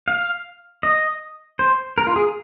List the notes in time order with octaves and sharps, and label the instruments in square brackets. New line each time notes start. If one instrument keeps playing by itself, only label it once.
[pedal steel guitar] F5
D#5
C5
A#4
F4
G#4